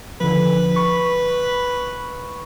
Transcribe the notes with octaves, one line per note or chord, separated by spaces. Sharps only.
D3 F3 B4
B5 C#6